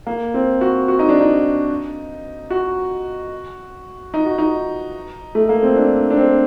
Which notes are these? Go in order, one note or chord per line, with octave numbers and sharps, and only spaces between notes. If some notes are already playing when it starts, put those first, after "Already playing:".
A#3
C4
F#4
F#4
D#4
D4
D#4
F#4
D#4
F#4
D#4
A3
A#3
C4
D4
D4
C4